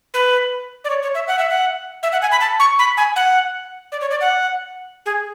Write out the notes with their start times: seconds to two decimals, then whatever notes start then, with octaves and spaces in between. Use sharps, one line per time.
0.14 B4
0.84 D5
0.90 C#5
1.02 C#5
1.15 E5
1.28 F#5
1.39 E5
1.49 F#5
2.03 E5
2.12 F#5
2.22 G#5
2.32 B5
2.41 A5
2.60 C#6
2.79 B5
2.97 G#5
3.16 F#5
3.92 D5
4.01 C#5
4.11 D5
4.21 F#5
5.06 G#4